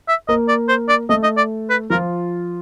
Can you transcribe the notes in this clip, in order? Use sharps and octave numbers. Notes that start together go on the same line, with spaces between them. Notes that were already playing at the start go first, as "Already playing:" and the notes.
E5
A#3 A#4 D#5
D5
C5
D5
A3 A4 D#5
D#5
D5
B4
F3 F4 A#4